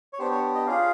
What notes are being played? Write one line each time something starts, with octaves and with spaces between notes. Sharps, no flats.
C#5
B3 D4 G4 C5
C#5
D#5
C#4 F4 G#4 F5